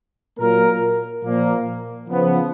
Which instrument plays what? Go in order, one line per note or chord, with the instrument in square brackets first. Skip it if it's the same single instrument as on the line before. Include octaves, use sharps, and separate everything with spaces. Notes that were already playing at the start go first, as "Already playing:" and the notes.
[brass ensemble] A#2 F#3 A#3 F4 A#4
A#2 F3 A#3
C#3 F3 B3